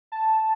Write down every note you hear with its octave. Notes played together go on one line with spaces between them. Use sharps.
A5